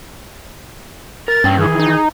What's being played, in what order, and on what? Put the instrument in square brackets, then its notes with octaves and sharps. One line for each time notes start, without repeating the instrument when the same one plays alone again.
[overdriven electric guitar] A#4 [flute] A6
[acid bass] G2 [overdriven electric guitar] C#4 G5
[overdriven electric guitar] D#3 E3 [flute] G#4
[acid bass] D#4